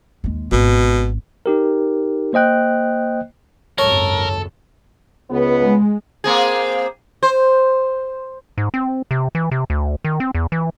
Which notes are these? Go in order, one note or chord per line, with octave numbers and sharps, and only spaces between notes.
D#2 G#3
G#1 B2
D#4 G4 A#4
A#3 C5 D#5 G5 F#6
G#1 C#2 F#2 A4 A#4 C#5
C#2 B3
G#3
A#3 C4 G#4
C5
G#2
C4
C3
E3
C3
D2
D#3
C4
E2
E3